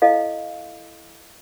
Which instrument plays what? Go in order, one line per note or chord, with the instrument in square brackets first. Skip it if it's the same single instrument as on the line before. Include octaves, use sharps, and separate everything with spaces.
[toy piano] E4 A4 D#5 F5